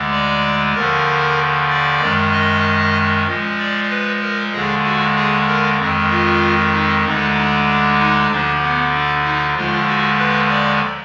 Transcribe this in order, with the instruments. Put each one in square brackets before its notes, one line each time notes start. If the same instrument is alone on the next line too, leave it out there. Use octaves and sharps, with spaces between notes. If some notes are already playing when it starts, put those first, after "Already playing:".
Already playing: [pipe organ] D2 D3 G#3
D5
D#2 D3 F3 A#4
D5
F#2 D#3 G#3
D#5
A#2 F3 G#3
D5
B4
A#4
D#2 D3 G#3 G#4
F#4
G#4
A#4
F2 D#3 G#3
F4
D#4
D2 D3 G#3 D#4
D4
D4
D#4
D2 D3 F3 D4
B3
D4
D#4
D#2 D3 F3 G#3 F4
F#4
B4
D5